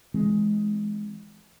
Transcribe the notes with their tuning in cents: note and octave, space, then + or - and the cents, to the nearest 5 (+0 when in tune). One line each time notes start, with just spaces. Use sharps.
E3 +0 G#3 +10 C4 +0